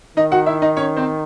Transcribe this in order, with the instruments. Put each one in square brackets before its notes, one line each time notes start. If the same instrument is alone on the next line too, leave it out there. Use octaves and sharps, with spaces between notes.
[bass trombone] D#3 [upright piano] D#4 D#5
[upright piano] F#4 F#5
E4 E5
D#4 D#5
C#4 C#5
C4 C5